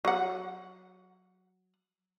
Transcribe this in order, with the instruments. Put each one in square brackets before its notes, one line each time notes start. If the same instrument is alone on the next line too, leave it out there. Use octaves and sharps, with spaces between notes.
[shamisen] F#3 F#5